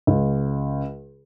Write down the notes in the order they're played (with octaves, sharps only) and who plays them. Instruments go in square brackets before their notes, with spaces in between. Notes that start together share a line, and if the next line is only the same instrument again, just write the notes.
[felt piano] C#2